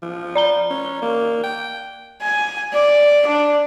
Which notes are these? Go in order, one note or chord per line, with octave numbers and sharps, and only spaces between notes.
F3
D5 A#5 G7
C#4
A#3
G5
G#5
D5
D4